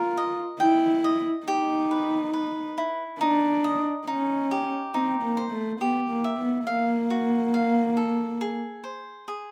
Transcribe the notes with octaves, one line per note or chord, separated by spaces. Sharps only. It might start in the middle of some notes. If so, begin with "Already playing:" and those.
Already playing: F4 A#4
D#5
E4 G5
D#5
D#4 G4
B4
B4
E4
D4 D#4
D#5
C#4 D#4
G4
C4 D#4
A#3
C5
A3
B3 G4
A#3
E5
B3
A#3 F5
F#4
F5
A4
G#4
C5
G#4